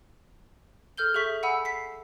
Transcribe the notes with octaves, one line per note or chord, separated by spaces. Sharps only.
A4 F6 G6 G7
G#4 A4 E5 C#6 B6
F#5 G#5 B5 E6
B6 C7